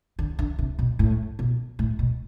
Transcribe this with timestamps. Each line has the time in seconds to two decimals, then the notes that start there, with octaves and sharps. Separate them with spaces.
0.19 D3
0.39 D3
0.59 C3
0.79 B2
0.99 A2
1.39 B2
1.79 A2
1.99 B2